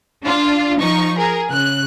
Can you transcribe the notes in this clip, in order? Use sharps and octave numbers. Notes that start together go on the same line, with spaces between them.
D4 F4
F3 D#4 C#6
G#4 A#4
C#3 F#6